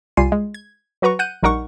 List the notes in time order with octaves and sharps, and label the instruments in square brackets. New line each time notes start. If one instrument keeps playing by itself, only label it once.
[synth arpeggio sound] C2 G3 F4 G#5 C7 D#7
G#3
G#6
F#3 F#4 B4 A#5 C#6
F#5 F#6 G6 D#7
A#1 G3 D#4 A#4 F#5 C#6